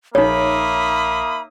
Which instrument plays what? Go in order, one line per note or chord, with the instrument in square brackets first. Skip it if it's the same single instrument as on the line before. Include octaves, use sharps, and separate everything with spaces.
[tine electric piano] A#1 [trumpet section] A#3 E5 D#6 [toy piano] D#4 C#5 [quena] B5